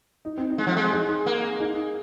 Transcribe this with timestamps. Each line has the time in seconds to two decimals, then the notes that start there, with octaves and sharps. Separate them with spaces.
0.25 D#4
0.38 C4
0.51 D#4
0.58 G#3
0.67 F3
0.77 G#3
0.92 D#4 G#4
1.26 A#3
1.59 D#4 G#4